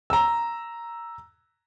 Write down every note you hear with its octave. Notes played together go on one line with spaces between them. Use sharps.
A#5 E6